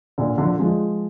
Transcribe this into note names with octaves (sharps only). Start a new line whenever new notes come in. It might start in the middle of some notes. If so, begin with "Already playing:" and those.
A#2 D3
D3 F3
F3 G#3